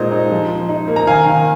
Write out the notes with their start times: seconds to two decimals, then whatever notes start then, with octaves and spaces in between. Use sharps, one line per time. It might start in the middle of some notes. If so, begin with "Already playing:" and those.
Already playing: A#2 G#3 D#4 C5 D#5
0.12 D#4
0.31 F3
0.50 F3
0.69 D#4
0.88 A#3
0.96 A#5
1.07 D#3 F5 G#5
1.26 D#3